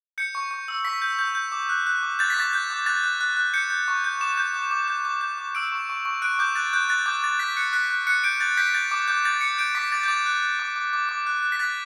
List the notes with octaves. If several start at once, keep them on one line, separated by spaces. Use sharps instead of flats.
G6 C#7
C#6
C#6
E6
C#6 B6
G6
G6
G6
D6
F#6
F#6
D6
G6 A6
B6
D6 A6
G6
D6
F#6 A6
F#6
F#6
F#6
G6 C#7
G6
C#6
G6
D6 E7
G6
D6
D6
G6
D6
G6
D6
E6 D7
C#6
C#6
C#6
F#6 D7
D6 G6
F#6 A6
F#6 G6
F#6 A6
D6 G6
D6 A6
F#6 B6
F#6 C#7
F#6 B6
F#6
F#6 C#7
G6 D7
G6 A6
G6 B6
G6 A6
D6
D6 G6
G6 A6
D6 C#7
G6 D7
D6 B6
D6 A6
G6
D6 A6
F#6
F#6
D6
D6
D6
D6
F#6
F#6
B6
F#6 A6